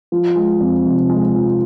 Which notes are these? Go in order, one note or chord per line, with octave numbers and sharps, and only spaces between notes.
F3
G#3
F2
F1
G#3
F3